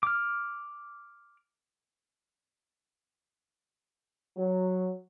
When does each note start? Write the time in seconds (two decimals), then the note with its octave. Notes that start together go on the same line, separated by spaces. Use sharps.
0.03 D6 F6
4.37 F#3